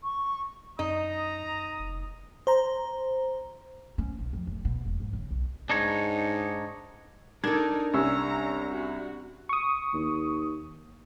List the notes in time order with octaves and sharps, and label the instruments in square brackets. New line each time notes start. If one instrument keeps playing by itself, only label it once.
[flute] C#6
[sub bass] F#2 [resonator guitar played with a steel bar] D#4 [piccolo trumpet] A#5 [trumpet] D#6
[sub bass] F1
[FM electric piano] C5 A#5
[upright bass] C#4
B1
F2
F1
B2
E1
G#2
C#3
B1
[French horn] G#2 [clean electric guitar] D4 D#4 C#5
[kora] D4 A4 [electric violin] D#4 A#4 [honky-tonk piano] G#6
[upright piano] C2 [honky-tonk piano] C#4 E6 [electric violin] A#5
[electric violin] F#4
[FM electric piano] C#6 D#6
[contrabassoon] D#2